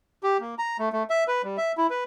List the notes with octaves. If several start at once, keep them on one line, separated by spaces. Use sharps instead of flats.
G4
A#3
A#5
A3
A3
E5
B4
G3
E5
E4
B4